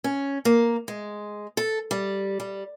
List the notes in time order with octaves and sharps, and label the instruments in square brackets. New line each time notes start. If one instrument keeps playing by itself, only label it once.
[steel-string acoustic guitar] C#4
A#3
G#3
A4
G3
G3